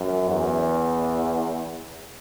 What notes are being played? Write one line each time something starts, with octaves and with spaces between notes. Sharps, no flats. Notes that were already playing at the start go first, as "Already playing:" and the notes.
Already playing: F#2
E2